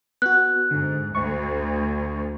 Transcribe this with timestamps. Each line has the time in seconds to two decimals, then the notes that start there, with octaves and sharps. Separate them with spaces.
0.22 B3 F#4 F#6
0.71 G#2 D3
1.15 D2 C#6